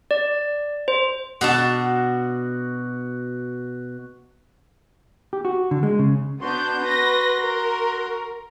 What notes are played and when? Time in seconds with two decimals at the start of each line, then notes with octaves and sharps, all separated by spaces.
0.11 D5
0.88 C5
1.41 B2 D4 F#4 A5
5.33 G4
5.45 F#4
5.71 D3
5.83 G#3
5.99 C#3
6.41 B3 D4 F#4 C6 G6
6.84 B4 A#6
7.42 A#4